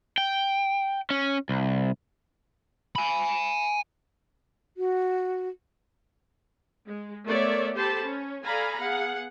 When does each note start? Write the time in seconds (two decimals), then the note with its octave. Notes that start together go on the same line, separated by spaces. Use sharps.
0.18 G5
1.10 C#4
1.49 C2
2.96 G#5 B5
4.77 F#4
6.86 G#3
7.27 A3 B3 A#4 C#5 D5 E5
7.74 G4 A4 C5 A5 B5
8.05 C#4
8.44 A4 D5 F5 G#5 A#5 B5
8.80 B3 G#4 F5 F#5